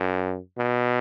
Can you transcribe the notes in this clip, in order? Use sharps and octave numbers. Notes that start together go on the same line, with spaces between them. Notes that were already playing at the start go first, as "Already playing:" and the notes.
Already playing: F#2
B2